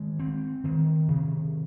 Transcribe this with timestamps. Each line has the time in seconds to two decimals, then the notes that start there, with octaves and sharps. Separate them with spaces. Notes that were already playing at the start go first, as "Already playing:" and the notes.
Already playing: D#3 G#3
0.19 C4
0.64 D#3
1.08 C3